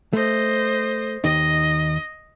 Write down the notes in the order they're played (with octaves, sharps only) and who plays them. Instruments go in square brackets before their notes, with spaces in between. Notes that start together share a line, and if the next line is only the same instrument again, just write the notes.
[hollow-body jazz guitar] A3 [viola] C5 D#5
[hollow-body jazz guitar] D#2 D#4 [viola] D#5